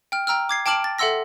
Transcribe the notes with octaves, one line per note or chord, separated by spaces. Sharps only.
G5 F6
G5 A#5 E6 F6
D6 G#6 C7
G5 A5 D6 F6 D7 F#7
A6
A4 E5 F#5 C6 E6 A#6